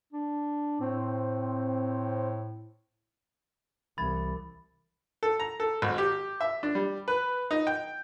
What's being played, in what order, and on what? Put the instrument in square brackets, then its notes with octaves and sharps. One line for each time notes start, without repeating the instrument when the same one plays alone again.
[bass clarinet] D4
[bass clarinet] A2 [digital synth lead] C4
[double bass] C2 [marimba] E3 [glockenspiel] B5 A6
[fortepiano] A4
A#5
A4
G#1
G4
E5
D4
G3
B4
D#4
G5